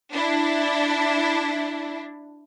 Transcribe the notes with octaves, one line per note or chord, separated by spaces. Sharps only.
D4 E4